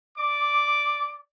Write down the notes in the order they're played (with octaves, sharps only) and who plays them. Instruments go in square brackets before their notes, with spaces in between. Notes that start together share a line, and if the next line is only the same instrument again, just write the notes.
[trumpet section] D5 D6